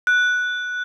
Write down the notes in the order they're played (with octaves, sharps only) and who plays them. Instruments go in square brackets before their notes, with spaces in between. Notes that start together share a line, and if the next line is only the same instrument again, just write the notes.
[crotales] F#6